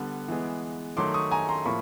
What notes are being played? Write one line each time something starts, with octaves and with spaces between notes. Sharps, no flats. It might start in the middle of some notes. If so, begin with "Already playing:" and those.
Already playing: D3 G3 B3
E3 G#3 B3
D#3 F#3 A3 C6 D6
C#6 D#6
G#5 A#5
A#5 C6
A2 F3 A#3 B5 C#6